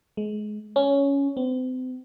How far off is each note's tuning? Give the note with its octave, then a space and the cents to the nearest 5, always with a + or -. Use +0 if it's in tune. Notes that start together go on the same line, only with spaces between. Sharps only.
G#3 +25
C#4 +10
C4 -40